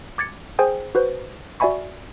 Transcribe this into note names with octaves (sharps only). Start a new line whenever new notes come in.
D6 G#6 A6 C#7
G#4 C5 G5 G#5 D#6
F#4 B4 C5
F#4 D5 E5 G#5 B5 C#6